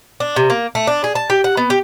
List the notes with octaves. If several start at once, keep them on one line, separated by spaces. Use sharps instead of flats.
D4
C3
A#3
A3
D4
G#4
A5
G4
F#5
B3
G4